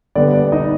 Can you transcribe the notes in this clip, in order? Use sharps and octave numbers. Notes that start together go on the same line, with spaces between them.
D3 G3 B3 D5
D5
D#4 D#5